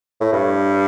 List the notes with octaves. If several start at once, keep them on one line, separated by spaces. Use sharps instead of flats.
A2
G2